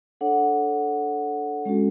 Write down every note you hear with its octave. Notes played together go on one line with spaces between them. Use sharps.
D4 A4 C#5 F#5
G#3 C#4 F#4 A4